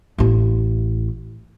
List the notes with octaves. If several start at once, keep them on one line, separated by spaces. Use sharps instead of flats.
A1 E4